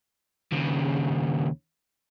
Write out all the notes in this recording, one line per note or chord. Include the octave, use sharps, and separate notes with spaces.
D#2 C#3